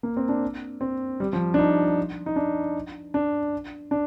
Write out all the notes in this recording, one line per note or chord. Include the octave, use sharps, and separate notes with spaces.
A#3
C4
D4
C4
G3
F3
D4
D#4
D#4
D4
D4
D4